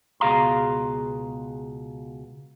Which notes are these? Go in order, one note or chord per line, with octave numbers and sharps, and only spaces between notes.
C#2 B2 G#4 F5 A#5 C6